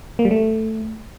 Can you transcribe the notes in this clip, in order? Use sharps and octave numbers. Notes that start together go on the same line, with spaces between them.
A#3
G3
A3